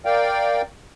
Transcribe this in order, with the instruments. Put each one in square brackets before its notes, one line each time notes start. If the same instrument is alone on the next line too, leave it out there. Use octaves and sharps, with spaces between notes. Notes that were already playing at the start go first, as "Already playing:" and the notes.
[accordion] A#4 D5 F5 G5